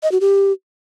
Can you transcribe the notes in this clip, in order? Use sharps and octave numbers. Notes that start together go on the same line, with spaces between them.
D#5
F#4
G4